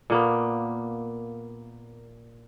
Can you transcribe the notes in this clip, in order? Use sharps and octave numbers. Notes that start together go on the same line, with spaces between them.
A#2 A#3 B3